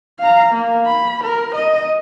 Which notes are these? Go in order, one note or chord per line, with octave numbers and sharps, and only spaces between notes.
F5 A#5
A#3
B5
A#4
D#5